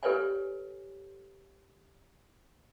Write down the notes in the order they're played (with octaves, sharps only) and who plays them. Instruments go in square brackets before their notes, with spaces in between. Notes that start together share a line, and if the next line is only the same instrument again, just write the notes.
[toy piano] G4 A4 B4 C#5 D5 G#5